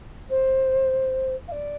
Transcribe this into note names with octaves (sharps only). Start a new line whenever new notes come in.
C5
F5
D5